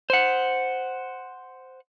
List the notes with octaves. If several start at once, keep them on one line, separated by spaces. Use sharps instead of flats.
C5 F#5